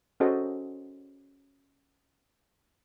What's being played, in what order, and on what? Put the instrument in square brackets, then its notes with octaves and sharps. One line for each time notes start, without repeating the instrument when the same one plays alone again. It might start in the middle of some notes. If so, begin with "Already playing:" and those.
[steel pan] C#4 F#4 A4 C5 D#5